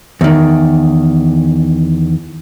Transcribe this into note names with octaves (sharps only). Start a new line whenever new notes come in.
E2 D#3